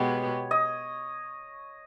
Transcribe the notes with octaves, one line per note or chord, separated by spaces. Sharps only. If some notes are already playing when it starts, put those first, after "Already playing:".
Already playing: B2 G#3 B3 G4 C#5
D#5